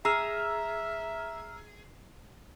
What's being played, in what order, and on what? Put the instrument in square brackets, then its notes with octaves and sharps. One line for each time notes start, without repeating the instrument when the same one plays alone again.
[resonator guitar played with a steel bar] G#4 [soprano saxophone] E5 [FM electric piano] A#5 E6 F6